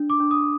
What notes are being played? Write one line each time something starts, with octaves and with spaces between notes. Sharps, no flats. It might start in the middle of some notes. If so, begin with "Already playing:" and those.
Already playing: D4
D6
D4
D#6